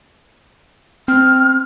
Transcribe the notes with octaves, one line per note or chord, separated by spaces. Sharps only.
C4 F6